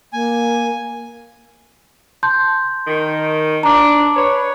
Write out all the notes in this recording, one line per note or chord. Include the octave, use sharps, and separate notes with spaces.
A#3 G#5
A5 C6 G6
D#3
D4 A#5 D6
B4 C#5